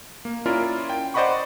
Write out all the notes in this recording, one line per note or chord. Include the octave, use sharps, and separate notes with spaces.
A#3
C#4 E4 F4 A#4 D5
G5
C5 D5 D#5 F#5 B5 C#6